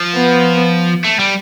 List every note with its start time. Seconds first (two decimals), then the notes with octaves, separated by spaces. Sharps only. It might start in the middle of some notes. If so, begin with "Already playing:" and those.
Already playing: F3
0.14 B3
1.04 A3
1.19 G3